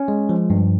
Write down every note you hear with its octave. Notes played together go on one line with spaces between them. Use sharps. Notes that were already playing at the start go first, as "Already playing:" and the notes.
Already playing: C#4
G#3
F3
G2